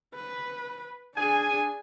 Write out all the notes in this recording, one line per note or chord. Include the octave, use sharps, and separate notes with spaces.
B4
D4 G#4 G#5